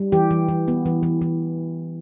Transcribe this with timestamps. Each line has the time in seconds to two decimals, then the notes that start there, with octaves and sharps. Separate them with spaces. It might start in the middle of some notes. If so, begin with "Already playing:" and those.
Already playing: G3
0.12 E3 G4
0.31 E3
0.48 E3
0.68 B3
0.86 E3
1.03 E3
1.22 E3